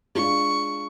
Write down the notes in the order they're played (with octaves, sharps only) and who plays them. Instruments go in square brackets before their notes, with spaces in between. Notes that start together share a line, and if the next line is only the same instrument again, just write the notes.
[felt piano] G#3 D4 F4 [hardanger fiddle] C#6